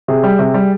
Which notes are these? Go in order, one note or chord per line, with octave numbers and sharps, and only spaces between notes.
C3 G#4
G3
C3
G3